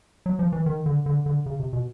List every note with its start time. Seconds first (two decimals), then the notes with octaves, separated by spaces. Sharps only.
0.26 F#3
0.39 F3
0.52 E3
0.66 D#3
0.86 D3
1.06 D3
1.26 D3
1.46 C#3
1.60 C3
1.73 B2